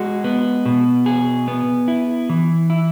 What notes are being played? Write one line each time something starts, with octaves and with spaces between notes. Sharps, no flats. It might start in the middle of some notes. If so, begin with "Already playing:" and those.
Already playing: G#3 F#4
B3
B2
G#4
B3
E4
E3
E4